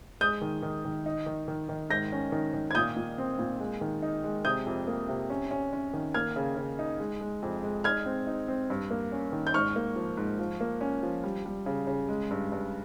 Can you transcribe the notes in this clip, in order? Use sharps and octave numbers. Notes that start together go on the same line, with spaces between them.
G#3 D#6 G6
D#3
D#3
D#3
D#4
D#3
D#3
D#3
G#2 G6 A#6
C#4
D#3
D#3
G#6
A#2 D#6 G6
A#2
C4
A#2
G#3
D#3
D#4
G#3
C3 D#6 G6
F2
A#3
C3
C#4
C#4
C#4
D#3
A#3 F6 G#6
C#3
C#3
D#4
G#3
G#3
F2
G#3
D#4 F6 G#6
C4
D#4
C4
G2
A#3
C#4
D#3
G6
G#2 C#6 F6
A#3
F3
G#2
F3
A#3
C#4
F3
G3
G3
C#3
C#3
G#3
G2
G2